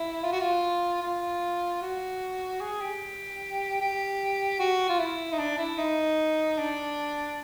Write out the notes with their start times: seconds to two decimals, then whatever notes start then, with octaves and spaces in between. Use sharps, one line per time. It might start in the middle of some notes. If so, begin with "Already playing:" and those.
Already playing: E4
0.23 F4
0.32 F#4
0.40 F4
1.03 F4
1.82 F#4
2.61 G#4
2.81 G4
3.80 G4
4.60 F#4
4.89 F4
4.99 E4
5.32 D#4
5.39 D4
5.58 E4
5.78 D#4
6.58 D4